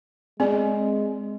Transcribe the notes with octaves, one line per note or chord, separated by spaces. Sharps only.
G#3 C4 G#4 D5